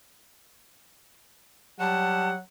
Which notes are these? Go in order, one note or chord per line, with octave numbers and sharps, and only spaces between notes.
F#3 G3 F#5 A5